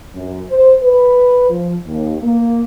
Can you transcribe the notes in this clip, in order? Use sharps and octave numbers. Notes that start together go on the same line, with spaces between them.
F#2
C5
B4
F3
D#2
A#3